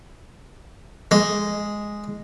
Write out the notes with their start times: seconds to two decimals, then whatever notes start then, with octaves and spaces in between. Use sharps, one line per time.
1.11 G#3